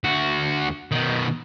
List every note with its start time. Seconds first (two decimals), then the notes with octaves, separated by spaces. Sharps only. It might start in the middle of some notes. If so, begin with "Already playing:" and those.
0.04 D2 F#4
0.92 B2 D#3